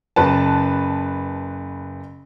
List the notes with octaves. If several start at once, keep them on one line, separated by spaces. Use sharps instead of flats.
F#1 B4 A5